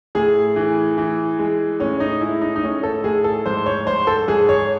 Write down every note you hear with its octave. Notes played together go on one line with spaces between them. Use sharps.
A2 G#4
E3
E3
G#3
A2 C#4
D#4
G#3 E4
D#4
D#4
A2 C#4
A4
A2 G#4
A4
G#2 C5
C#5
G#2 C5
A4
G#2 G#4
C#5